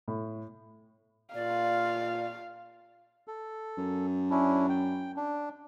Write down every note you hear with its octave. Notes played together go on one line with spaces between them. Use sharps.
A2
A#2 F4 D5 F5
A4
F#2
C#4 D4 E4
G5
D4